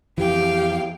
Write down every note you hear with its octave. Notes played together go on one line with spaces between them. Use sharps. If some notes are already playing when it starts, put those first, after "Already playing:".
F2 E3 G4 F5 G5